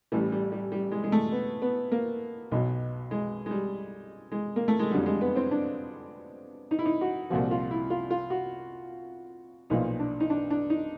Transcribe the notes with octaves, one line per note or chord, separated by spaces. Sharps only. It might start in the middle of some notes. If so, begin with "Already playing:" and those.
A1 A2 E3 G3
G3
G3
G3
G#3
G#3
A3
B3
B3
A#3
B1 B2 F#3
G#3
G#3
G3
G#3
A#3
A3
G#3
F2 D3 F#3 G3
G3
G#3
B3
C4
D4
D#4
E4
D#4
F#4
C2 A#2 F3 F#4
F4
E4
F4
F4
F#4
B1 A#2 F3 D#4
D4
D#4
D4
D4
D#4